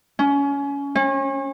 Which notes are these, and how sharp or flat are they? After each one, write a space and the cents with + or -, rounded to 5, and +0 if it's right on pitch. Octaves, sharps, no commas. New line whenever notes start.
C#4 +25
C#4 -35